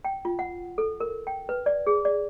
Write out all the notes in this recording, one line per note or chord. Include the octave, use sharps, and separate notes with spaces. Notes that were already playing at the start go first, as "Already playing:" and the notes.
G5
F4
F#5
A4
A#4
G5
B4
D5
G#4
D5